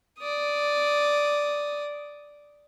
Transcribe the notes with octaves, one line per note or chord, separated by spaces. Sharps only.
D5 D#6